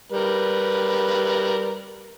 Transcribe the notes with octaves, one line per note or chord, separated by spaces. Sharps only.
G3 A#4 B4